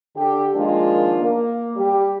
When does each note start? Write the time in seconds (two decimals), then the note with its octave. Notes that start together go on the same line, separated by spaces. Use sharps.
0.15 D3 G4
0.55 D#3 F3 G#3 A#3 D4 F4
1.20 A#3
1.76 G3 G4